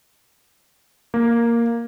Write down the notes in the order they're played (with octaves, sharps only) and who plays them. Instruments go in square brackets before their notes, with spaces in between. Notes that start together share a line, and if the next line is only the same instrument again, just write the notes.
[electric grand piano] A#3